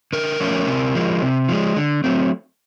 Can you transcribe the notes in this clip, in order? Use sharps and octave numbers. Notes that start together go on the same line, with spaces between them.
D3 A#4
F3 A3 C#4
C3
F3 G#3
C3
F3 G#3
D3
F#3 A3 C4